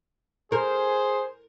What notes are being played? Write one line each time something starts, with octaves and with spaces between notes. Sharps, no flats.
G#4 A#4 C5